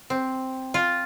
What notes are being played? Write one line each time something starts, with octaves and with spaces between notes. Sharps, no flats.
C4
F4